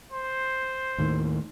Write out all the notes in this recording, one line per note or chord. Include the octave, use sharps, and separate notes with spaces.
C5
D#2 A2 D#3